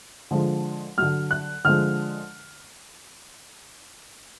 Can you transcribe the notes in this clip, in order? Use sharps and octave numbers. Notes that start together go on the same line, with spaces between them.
D3 F3 G#3
D3 F#3 F6
F#6
D3 F3 G#3 F6